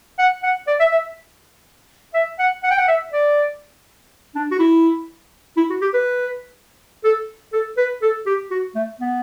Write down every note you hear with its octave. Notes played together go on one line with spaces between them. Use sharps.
F#5
F#5
D5
E5
E5
E5
F#5
F#5
G5
F#5
E5
D5
D4
F#4
E4
E4
F#4
G4
B4
A4
A4
B4
A4
G4
F#4
A3
B3